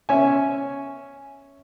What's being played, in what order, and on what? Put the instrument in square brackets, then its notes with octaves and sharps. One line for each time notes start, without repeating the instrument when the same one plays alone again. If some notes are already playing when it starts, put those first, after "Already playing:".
[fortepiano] C#4 E5 G#5